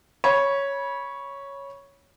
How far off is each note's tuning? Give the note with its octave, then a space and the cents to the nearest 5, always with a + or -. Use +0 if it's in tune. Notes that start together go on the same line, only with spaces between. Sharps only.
C#5 +0 B5 -25